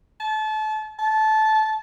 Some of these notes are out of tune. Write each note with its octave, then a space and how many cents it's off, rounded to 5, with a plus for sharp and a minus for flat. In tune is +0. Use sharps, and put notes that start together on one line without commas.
A5 -30
A5 -20